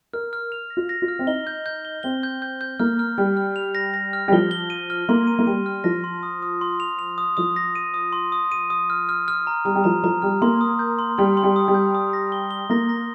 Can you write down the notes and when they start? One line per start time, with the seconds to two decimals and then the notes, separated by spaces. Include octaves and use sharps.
0.13 A#4 F6
0.33 F6
0.52 F7
0.70 A#6
0.77 F4
0.89 A#6
1.02 F4
1.08 F6
1.19 C4
1.27 D#4 G7
1.47 G6
1.66 G6
1.85 G7
2.03 C4 G7
2.23 G6
2.42 G6
2.61 G6
2.80 A#3 F6
2.99 F6
3.18 G3 F6
3.37 F6
3.56 F7
3.75 A#6
3.94 A#6
4.13 F6
4.28 G3
4.32 F3 G7
4.51 G7
4.70 D#7
4.90 F6
5.09 A#3 C6
5.27 D#7
5.39 A#3
5.47 G3 D#7
5.66 F6
5.84 F3 A#6
6.04 C6
6.23 D#6
6.42 D#6
6.61 C6
6.80 F7
6.99 F7
7.18 D#6
7.37 F3 D#6
7.56 A#6
7.75 D#7
7.94 D#6
8.13 C6
8.32 D#6
8.52 D#7
8.70 D#6
8.90 F6
9.09 F6
9.28 F6
9.47 A#5
9.65 G3 A#5
9.75 G3
9.84 F3 A#5
10.03 F3 A#5
10.22 G3 F6
10.42 A#3 C6
10.61 D#6
10.79 G6
10.99 C6
11.18 G3 C6
11.37 C6
11.43 G3
11.56 D#6
11.68 G3
11.74 G6
11.95 D#6
12.13 A#6
12.32 G7
12.51 G7
12.70 A#3 A#6
12.89 A#6